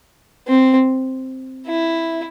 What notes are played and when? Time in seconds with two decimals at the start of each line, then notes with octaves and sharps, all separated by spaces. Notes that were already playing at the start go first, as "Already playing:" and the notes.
0.48 C4
1.67 E4